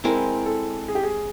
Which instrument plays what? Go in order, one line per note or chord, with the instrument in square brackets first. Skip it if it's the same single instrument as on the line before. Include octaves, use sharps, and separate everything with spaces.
[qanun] G#3 C4 E4 [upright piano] A#4
[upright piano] A4
G#4
G4
G#4